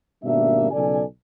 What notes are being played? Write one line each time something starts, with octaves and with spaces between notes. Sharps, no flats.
G#1 B2 G3 A#3 D4 E5
B1 C#3 A4 D5 G#5